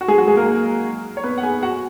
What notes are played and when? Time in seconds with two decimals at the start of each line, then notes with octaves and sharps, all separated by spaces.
0.01 F#4
0.08 G#3 G#4
0.18 F#3 F#4
0.28 G#3 G#4
0.36 A#3 A#4
1.17 C#5
1.24 B3 B4
1.38 F#5
1.43 G#4 G#5
1.63 F#4 F#5